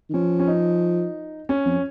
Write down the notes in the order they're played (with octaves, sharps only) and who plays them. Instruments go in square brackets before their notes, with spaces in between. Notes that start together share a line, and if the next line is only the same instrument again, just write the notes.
[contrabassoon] D#3
[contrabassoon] F3 [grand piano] C#4
[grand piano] C#4
D#4
C#4
[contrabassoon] F2